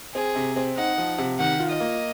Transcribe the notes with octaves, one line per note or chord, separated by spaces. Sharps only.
C4 G#4
C3
C4
D#4 F#5
F3
C3
D#3 F#5
F4
D#5
A#3